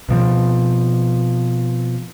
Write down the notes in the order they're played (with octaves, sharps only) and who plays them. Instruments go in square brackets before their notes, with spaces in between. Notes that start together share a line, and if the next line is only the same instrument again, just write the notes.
[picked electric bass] B2 F3 C4